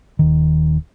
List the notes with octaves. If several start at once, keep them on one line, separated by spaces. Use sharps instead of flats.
D#1 D#3